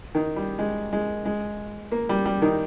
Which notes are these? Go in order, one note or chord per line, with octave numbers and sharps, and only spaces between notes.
D#3
G3
G#3
G#3
G#3
A#3
G3
G3
D#3